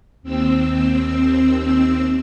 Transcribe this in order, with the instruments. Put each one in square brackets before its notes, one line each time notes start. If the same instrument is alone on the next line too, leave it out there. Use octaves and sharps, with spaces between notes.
[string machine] D#2 C4 E6